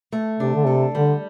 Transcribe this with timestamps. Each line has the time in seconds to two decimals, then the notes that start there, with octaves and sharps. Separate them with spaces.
0.12 A3
0.39 C3 D4
0.55 D3
0.67 C3 A4
0.95 D3 G3